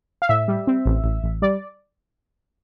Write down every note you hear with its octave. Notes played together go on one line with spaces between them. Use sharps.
F5
A2 E5
G3
C4
A1
A1
A1
G3 D5